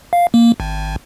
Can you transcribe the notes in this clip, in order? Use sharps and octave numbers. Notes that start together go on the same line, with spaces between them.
F5
A#3
G#1